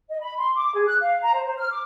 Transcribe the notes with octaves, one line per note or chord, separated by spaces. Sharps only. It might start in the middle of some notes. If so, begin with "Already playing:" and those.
D#5
B5
C6
D6
G#4
F#6
F5
A#5
C5
C5
F6
D6